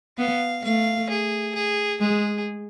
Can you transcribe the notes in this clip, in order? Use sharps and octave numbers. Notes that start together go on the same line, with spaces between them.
B3 F5
A3 F5
G#4
G#4
G#3 G#4